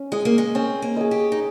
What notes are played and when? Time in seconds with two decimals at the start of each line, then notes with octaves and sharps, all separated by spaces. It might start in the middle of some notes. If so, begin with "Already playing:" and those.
Already playing: C#4
0.12 G#3 G#4 D#5
0.25 A#3
0.38 G#3
0.55 C4 C#4
0.82 A#3
0.97 G#4 D#5
1.11 G4
1.32 D#4